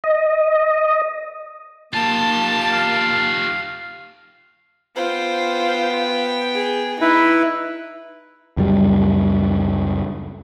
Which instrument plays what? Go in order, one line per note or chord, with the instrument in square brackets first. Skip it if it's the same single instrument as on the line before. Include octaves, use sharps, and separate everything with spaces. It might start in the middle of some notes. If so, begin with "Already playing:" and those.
[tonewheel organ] D#5
[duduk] A#3 [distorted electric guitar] F4 G4 [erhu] A5
[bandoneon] F5
[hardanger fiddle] B3 G5 [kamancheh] F4 C5
[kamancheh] G#4
[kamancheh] D#4 [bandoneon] E4 B4
[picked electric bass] C#2 F#2 G3